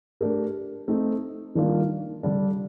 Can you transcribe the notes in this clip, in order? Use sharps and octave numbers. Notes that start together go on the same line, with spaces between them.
A3 D4 G4 A#4
A3 C4 D#4
D#3 G3 A#3 D4 F4
D3 G3 D4